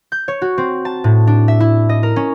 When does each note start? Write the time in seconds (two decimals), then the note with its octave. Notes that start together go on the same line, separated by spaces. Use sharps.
0.12 G6
0.28 C#5
0.42 F#4
0.58 C4
0.85 A5
1.04 A2
1.27 D4
1.48 E5
1.60 E4
1.89 D#5
2.03 A#4
2.16 C#4